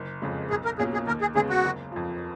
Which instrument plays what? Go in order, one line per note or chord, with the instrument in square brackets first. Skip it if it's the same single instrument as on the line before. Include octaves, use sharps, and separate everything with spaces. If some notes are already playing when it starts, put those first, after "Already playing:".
Already playing: [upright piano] F#1
F2 C#3 G#3
[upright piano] B1 [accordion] G#4
[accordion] A#4
[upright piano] B2 A#3 C#4 F4 [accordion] G#4
[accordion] G#4
[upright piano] D#2 [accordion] A#4
[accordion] G#4
[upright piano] C#3 G#3 B3 [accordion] G#4
[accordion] F#4
[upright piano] F#1
F2 F3